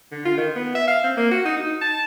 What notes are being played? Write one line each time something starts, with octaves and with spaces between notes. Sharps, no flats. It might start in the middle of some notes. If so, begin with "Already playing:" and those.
D3
F4
D#3
B3
E5
F5
C4
A#3
F#4
D#4
D#4
A5